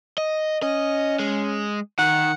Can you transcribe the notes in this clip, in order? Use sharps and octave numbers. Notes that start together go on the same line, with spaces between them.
D#5
C#4 D#5
G#3
D#3 F#5